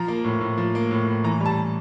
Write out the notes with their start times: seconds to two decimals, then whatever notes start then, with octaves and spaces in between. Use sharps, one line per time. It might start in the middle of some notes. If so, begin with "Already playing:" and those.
Already playing: F3 A#5
0.08 A#3
0.24 A2
0.41 A2
0.58 F3
0.75 A#3
0.91 A2
1.07 A2
1.24 E3 A#5
1.40 G3
1.46 A5